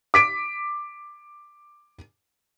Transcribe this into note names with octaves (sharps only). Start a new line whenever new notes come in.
D6 B6 D7